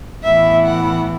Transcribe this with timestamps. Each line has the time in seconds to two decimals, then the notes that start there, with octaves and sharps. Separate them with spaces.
0.24 A2 E3 B3 E4 E5
0.65 F#5